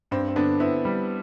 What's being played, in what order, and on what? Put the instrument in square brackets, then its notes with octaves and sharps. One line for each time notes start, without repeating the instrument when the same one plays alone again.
[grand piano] G2 [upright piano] C4
[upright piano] C4
[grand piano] D3 [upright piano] B3 D4
[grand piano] B3 [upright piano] C4 E4
[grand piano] G3